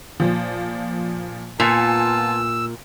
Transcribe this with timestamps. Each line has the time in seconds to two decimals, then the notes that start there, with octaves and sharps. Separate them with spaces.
0.20 A#2 F3
1.60 A#2 B3 F4 G#5 A5 E6 A6 C#7